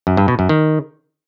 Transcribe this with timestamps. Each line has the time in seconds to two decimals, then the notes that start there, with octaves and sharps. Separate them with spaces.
0.07 F#2
0.17 G2
0.28 B2
0.39 F#2
0.49 D#3